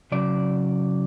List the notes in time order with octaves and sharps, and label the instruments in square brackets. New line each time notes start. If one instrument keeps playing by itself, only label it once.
[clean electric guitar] C#3 F#3 D5